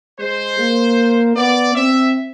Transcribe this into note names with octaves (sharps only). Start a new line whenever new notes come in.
G#3 C5
A#3
B3 D5
C4 E5